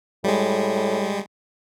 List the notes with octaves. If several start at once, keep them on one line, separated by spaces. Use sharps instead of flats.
A2 G3 G#3